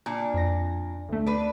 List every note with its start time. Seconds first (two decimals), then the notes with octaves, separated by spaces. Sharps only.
0.06 A#2 D4
0.34 F2 A#6
1.09 D2 A3
1.26 D4 B4